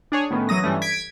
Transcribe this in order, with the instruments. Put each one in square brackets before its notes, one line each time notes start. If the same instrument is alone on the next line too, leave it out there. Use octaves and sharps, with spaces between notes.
[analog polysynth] D4 G#4 C#5
A2 D#3 B3 C#4
E3 F#3 D#6 A#6
G2 E3 G3 A3 C#4
G#6 B6 D7